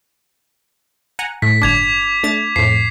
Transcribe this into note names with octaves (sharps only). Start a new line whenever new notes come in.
F#5 G#5 A#5
A2 B6
G1 D4 D6 G#6 F7
A3 D4 A6
F2 A2 C7